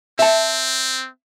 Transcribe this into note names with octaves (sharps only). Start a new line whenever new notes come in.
C4 E5 A5